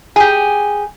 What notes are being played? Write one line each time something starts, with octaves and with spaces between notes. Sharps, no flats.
G4 G#4